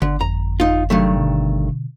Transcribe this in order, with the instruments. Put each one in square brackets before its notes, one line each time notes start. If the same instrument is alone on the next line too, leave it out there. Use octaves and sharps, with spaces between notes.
[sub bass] G1 [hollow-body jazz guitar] D3
[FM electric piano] F2 [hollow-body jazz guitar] A#5
[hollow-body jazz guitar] D#4 F4
[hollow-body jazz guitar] G2 D#3 A3 [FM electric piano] C3 F#3
[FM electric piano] B2 D3